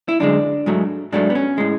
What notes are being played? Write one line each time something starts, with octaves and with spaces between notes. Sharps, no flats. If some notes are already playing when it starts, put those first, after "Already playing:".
E4
F#2 D3 G#3 D4
G#2 F#3 A3
G#2 F#3 A3 D4
B3
C#4
A2 G#3